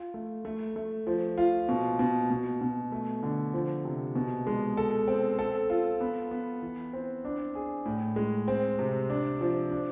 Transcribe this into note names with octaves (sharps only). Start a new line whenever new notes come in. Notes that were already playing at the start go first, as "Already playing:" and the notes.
Already playing: F4
A3
A3
A3
F3
F4
B2
B2
B2
B2
A3
D3
F3
C3
B2
G#3
A4
C4
A4
F4
B3
B3
E3
C4
D4
G#4
A2
G#3
C4
C3
D4
F3
D4